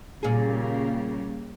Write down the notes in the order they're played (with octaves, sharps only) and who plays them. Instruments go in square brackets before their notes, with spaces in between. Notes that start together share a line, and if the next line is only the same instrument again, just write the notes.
[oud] A#2 G#4 [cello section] C#3 G3 A#3